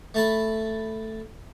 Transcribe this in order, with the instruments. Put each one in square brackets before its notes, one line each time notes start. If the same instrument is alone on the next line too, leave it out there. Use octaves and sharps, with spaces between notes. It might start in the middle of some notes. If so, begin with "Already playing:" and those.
[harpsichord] A3 A5 B5